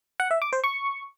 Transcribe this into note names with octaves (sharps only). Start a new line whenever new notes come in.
F#5
E5
D6
C5
C#6